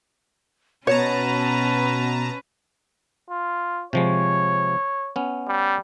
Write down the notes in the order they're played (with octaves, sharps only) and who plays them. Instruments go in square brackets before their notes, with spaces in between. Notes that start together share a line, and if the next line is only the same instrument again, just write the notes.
[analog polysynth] B2 A5 A#5 [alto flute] B3 [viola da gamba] C#4 B4 [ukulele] C#5
[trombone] F4
[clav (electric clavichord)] C3 F3 G#3 [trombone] C#5
[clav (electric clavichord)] B3 C#4
[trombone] G3